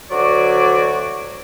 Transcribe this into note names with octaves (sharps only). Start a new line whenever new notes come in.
D2 F#3 F#4 C#5 D5 D6